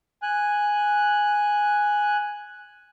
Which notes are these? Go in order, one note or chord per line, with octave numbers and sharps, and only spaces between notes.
G#5 F#6